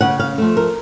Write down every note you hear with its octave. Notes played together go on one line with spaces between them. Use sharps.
C#3 F#5
F5
F3 A3
A#4